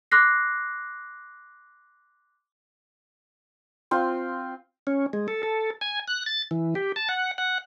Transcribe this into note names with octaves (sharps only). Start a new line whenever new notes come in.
C6 D6 F6 F#6 A#6 C7
C4 F4
C#4
G#3
A4
A4
G#5
F#6
A6
E3
G4
A5
F#5
F#5